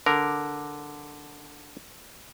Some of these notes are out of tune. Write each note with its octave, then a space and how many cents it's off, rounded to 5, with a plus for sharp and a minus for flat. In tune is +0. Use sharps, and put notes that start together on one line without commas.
D3 +0 A#4 +0